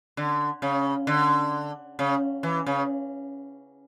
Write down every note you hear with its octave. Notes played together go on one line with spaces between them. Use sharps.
D3
C#3
D3
C#3
E3
C#3